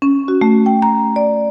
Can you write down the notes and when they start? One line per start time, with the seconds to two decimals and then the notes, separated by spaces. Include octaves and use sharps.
0.02 C#4
0.28 F#4
0.41 A3
0.66 G5
0.82 A#5
1.16 D5